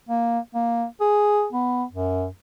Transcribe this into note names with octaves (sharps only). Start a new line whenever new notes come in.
A#3
A#3
G#4
B3
F#2